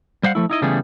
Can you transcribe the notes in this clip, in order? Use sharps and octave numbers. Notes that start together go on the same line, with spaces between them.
G3 C5 F5 F#5
F3 A3 E4
D#4 E4 D#5
C#3 E3 G3 A3 B3 G#4